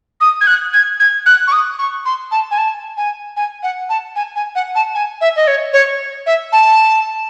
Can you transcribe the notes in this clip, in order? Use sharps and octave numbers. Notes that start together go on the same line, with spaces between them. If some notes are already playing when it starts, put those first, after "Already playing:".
D#6
G#6
F#6
G#6
G#6
F#6
C#6
D#6
C#6
C6
A5
G#5
A5
G#5
G#5
F#5
A5
G#5
G#5
F#5
A5
G#5
E5
D#5
C#5
C#5
E5
A5